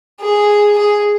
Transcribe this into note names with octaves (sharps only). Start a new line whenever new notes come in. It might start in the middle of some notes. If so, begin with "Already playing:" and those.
G#4
G#4